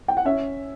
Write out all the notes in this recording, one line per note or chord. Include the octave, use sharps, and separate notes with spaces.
G5
F#5
C#4 E5